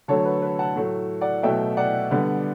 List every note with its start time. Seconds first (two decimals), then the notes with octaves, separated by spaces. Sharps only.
0.08 D3 F#3 A3 A4 C#5
0.25 B4
0.42 B4
0.59 F#5 A5
0.76 A2 F#3 A3
1.21 D5 F#5
1.43 B2 F#3 A3 E5 G5
1.77 D5 F#5
2.11 D3 G3 B3